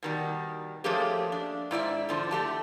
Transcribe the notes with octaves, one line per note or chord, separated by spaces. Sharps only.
B2 D#3 G3
F3 A3 A#3 C#4 G4 G#4
D4
G#2 E4 D5 E5
E2 D3 F3
A3 G4 A5